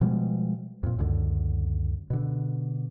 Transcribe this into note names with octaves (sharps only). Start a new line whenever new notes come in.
B2 F3 G3 G#3
F2 A#2
C#2 F#2 D3
B2 D3